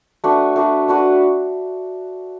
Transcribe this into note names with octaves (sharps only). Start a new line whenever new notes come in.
A3 D4 F#4 B4
A3 D4 F#4 B4
A3 D4 F#4 B4